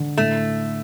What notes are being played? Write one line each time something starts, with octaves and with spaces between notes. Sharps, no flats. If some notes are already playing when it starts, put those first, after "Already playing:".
Already playing: D3
A2 A3